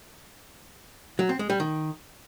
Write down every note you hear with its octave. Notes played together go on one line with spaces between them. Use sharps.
F#3
C4
G#3
G3
D#3